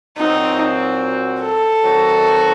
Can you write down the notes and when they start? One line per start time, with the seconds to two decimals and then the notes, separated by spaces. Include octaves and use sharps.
0.17 A#2 F#3 C4 D#4 F#4
1.42 A4
1.83 D#3 F#3 C4 D#4 F#4